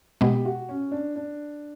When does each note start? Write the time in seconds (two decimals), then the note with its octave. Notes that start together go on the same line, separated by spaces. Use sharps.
0.21 B2 G#3 B3 G4
0.45 F#4
0.69 C#4
0.91 D4
1.16 D4